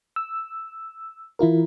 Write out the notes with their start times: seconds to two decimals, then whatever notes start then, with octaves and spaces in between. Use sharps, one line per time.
0.16 E6
1.39 E3 E4 F4 A#4